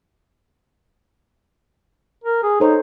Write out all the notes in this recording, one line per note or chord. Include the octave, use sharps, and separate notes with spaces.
A#4
G#4
D#4 A4 C5 C#5